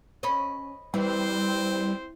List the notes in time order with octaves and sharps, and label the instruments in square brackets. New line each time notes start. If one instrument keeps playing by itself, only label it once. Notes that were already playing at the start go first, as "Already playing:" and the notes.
[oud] C#4 [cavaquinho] D#5 B5
[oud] E3 [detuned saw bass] G3 [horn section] C4 C5